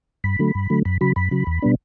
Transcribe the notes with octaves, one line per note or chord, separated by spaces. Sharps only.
G2 B5
D3 F#3 A3
G2
D3 F#3 A3
F#2 B5
C#3 F#3 B5
F#2 B5
C#3 F#3
E2
B2 G3 B3 D4